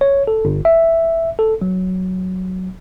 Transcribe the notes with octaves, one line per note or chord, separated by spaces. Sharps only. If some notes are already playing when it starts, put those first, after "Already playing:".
C#5
A4
G1
E5
A4
F#3